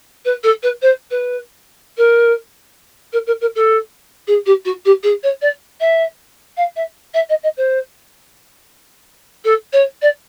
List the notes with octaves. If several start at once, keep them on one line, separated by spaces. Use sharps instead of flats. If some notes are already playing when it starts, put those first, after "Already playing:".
B4
A4
B4
C5
B4
A#4
A#4
A#4
A#4
A4
G#4
G4
F#4
G4
G#4
C#5
D5
E5
F5
E5
E5
D#5
D#5
C5
A4
C#5
D5